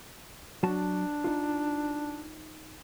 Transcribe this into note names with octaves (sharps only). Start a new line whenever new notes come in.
F#3 D4 F#4 A5
D#4 F4